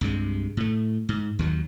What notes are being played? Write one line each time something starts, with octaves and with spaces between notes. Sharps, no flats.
C2 G2 C3 G#3
A2 A3
G#2
D#2 D#3 F#3